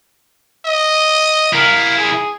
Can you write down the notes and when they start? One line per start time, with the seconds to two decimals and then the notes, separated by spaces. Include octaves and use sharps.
0.65 D#5
1.53 E4 A#4 F5
1.97 G#4